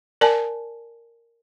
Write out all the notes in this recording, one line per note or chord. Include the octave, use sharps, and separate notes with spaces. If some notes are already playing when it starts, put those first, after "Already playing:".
A#4 D5 G#5 A5